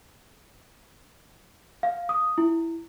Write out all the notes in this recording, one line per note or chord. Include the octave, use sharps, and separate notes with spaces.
F5
D#6
E4